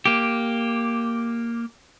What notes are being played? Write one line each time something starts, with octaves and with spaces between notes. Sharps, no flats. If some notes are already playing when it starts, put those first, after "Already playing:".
A#3 G4